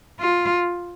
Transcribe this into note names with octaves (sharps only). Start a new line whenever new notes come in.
F4